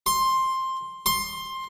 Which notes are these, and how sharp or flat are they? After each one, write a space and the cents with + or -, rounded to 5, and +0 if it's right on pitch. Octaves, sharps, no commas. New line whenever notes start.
C6 +10
C6 +15